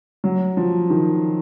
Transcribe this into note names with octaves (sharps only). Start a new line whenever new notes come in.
F#3
F3
D#3